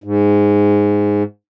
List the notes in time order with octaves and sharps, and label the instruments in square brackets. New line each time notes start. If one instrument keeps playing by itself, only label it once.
[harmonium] G#2